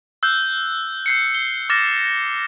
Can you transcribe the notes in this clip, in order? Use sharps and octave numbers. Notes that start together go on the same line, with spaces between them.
E6 F#6 G6
G6 C7 C#7
G7
D6 F6 A6 A#6 E7